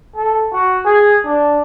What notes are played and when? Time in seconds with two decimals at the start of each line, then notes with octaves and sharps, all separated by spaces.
0.16 A4
0.53 F#4
0.85 G#4
1.25 D4